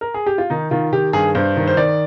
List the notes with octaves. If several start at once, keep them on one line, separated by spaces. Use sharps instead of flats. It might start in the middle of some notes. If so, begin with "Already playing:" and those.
A#4
G#4
G4
F4
D#3 D#4
D#3 F4
D#3 G4
G2 G#4
G2 C5
D#3
C5
D#3 D5